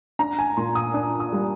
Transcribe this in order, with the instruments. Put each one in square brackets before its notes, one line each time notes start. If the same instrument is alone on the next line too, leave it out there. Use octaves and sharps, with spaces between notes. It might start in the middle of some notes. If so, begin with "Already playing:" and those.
[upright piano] D4 A#5
G#5
A#2 C6
D#6
D4 D#6
D#6
G3